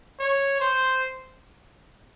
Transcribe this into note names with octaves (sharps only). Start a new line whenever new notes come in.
C#5
C5